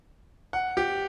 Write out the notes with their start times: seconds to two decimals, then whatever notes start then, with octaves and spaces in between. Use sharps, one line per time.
0.53 F#5
0.77 G4